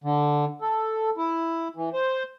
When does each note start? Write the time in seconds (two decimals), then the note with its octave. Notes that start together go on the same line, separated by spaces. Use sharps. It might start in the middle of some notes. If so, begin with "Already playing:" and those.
0.04 D3
0.61 A4
1.17 E4
1.76 E3
1.93 C5